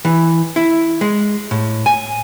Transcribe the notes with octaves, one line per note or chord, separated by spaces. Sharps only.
E3
E4
G#3
A2
G#5